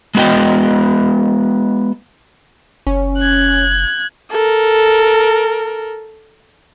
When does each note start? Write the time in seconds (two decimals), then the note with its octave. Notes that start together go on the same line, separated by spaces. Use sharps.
0.15 G#3 B3 F#4 D#5 G5
2.87 F#1 C#4
3.18 F#6 G#6
4.31 A4 A#4